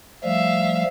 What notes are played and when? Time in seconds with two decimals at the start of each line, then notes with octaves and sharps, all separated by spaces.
0.24 F3 G3 A3 E5 F5